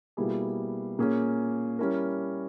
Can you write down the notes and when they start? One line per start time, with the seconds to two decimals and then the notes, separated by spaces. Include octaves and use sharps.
0.17 B2 G3 A#3 E4 G#4
0.99 A#2 A#3 C#4 G#4
1.79 G3 C#4 E4 A#4